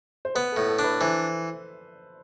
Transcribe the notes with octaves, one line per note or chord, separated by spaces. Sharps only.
C5
B3 B4
A2 A4
A4
D4
B4
E3 C5